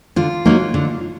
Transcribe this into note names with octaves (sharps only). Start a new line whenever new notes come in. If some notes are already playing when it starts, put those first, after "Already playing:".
D3 F4
F#3 A#3 D#4
D3